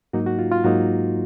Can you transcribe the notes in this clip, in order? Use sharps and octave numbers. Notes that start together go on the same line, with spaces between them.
G#2 F#3 A#3 D#4 F#4
F#4
F4
F4
G#2 F#3 A#3 D#4 F#4